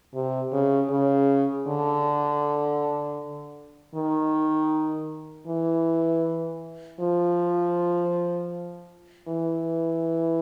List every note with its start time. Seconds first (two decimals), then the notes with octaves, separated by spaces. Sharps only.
0.14 C3
0.53 C#3
0.91 C#3
1.67 D3
3.95 D#3
5.47 E3
7.00 F3
9.28 E3